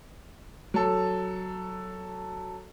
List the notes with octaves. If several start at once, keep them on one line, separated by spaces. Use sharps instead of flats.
F#3 A4